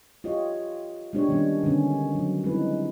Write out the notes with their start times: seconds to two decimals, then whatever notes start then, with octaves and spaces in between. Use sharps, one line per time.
0.24 F4 G4 C#5 D#5
1.13 G#3 B3 D4 G4 C#5
1.29 D#3 G3 B3 C#4 D4
1.63 D3 D#3 G#3 B3 C#4
2.15 F#3
2.44 G3 G#3 C4 D#4 E4 B4